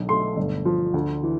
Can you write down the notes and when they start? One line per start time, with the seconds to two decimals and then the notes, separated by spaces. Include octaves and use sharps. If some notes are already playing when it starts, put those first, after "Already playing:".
Already playing: B1 D3
0.08 A3 C6
0.37 G1
0.65 F3
0.94 D2
1.23 E3